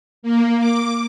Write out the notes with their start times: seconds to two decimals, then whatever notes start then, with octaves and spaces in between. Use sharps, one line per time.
0.23 A#3
0.58 D6